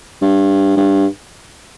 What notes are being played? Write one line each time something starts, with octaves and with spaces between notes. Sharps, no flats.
G2
G2